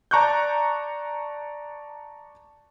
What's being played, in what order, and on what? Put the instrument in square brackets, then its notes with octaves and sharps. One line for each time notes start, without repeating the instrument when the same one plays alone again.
[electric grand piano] D5 A5 A#5 C#6 F#6 G6